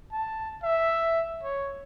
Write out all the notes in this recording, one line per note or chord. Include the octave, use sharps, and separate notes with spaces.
A5
E5
C#5